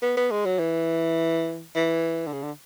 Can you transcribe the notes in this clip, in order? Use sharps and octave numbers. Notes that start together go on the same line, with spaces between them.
B3
B3
G#3
F#3
E3
E3
D3
C#3
D3